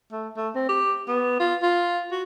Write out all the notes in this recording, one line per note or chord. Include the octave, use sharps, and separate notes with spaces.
A3
A3
C4
G4
B3
F4
F4
F#4